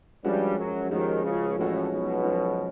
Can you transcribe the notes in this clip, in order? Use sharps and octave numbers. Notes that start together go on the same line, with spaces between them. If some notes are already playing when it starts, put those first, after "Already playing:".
G2 F3 G3 G#3 C#4 F#4
F#2 F#3
D#2 D#3 F3 G#3 C#4 F#4
C#2 C#3
A1 A2 F3 G#3 C#4 F#4
B1 B2
F3 G#3 C#4 F#4